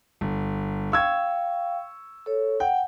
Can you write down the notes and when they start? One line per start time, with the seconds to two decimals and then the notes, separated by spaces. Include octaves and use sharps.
0.21 G1
0.92 F5 G5 C#6 E6 G#6
2.26 A4 C#5
2.60 F#5 G5